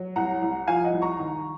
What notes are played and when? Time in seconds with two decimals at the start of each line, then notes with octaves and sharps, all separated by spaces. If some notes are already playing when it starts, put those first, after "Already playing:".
Already playing: F#3
0.16 C2 F#5 A#5
0.42 C2
0.67 F3 F5 G#5
0.84 D#5 F#5
0.93 C2
1.02 A#5 C#6
1.19 D#3